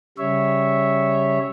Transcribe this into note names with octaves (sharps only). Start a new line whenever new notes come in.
C#3 G3 C#5 E5